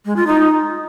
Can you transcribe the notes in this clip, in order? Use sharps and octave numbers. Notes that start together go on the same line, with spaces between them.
G#3
F4
D#4